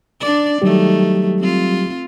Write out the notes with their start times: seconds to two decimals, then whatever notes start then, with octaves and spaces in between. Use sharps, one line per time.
0.21 D4 D5
0.62 D#3 F#3 G3 A3 G4
1.39 C4 F4